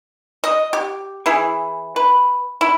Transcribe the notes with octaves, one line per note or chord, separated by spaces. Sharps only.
D#5
G4
E3 E4 G#4
B4
E4